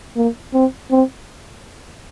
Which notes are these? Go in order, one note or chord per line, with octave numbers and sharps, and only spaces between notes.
A#3
C4
C4